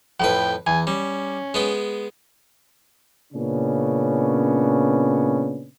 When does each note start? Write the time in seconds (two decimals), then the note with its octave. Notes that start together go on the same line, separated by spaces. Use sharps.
0.20 F2 A2 B4 G5
0.67 E2 G#5
0.87 G3 C#4
1.54 G#3 B3 G5
3.33 A#2 C#3 B3 C#4 D4